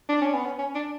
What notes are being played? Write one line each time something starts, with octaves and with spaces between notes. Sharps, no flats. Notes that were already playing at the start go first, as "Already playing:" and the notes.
D4
C#4
B3
C#4
C#4
D4